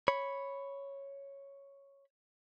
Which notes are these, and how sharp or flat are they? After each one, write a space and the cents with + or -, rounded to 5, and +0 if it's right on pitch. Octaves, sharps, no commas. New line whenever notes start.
C#5 +0 B5 +0